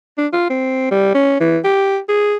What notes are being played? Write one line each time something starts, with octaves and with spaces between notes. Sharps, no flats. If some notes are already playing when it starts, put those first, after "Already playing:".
D4
F4
C4
G3
C#4
E3
G4
G#4